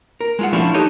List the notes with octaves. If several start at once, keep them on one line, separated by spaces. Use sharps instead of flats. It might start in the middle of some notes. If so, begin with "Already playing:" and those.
A#4
G#3 F4 F#5
F3 A3 C#4 D4 E4 F4
D4 D#4 G4 A4 C#5 D#5